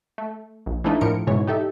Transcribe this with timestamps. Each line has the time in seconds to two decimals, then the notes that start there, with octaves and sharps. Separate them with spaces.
0.18 A3
0.66 A#1
0.84 E3 F3 A3 D4 D#4
1.01 A2 F3 A#4 C#7 D7
1.27 C#2 G#2 B2 E3 C#5
1.47 D#4 G4 A4 E5